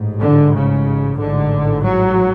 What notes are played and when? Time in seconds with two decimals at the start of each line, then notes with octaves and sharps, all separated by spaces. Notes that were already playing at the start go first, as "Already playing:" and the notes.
Already playing: A1 G#2
0.20 D3
0.53 C#3
1.19 A1 G#2 D3
1.83 F#3